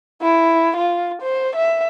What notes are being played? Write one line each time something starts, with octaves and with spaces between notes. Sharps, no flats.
E4
F4
C5
E5